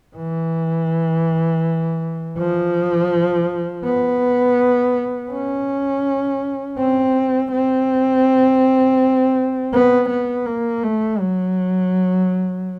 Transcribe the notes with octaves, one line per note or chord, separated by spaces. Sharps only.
E3
F3
B3
C#4
C4
C4
B3
B3
A#3
A3
F#3